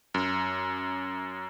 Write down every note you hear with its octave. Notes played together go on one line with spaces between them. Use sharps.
F#2